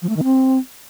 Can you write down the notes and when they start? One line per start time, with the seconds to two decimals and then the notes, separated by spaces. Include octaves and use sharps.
0.02 F3
0.09 A3
0.16 D#3
0.24 C4